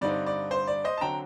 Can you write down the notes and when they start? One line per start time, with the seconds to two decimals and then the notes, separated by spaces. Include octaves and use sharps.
0.01 G2 D3 G3 C4 D#4 D5
0.26 D5
0.51 C5
0.67 D5
0.84 C5 D#5
0.97 A5
1.01 D3 F#3 C4 G5 A#5